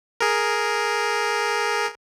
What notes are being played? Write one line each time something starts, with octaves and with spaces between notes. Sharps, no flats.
G#4 A#4